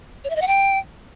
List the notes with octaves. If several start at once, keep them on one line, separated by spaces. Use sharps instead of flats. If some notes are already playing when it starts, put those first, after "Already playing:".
C#5
E5
D#5
F#5
G5